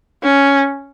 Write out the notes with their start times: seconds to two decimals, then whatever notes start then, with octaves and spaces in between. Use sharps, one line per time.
0.23 C#4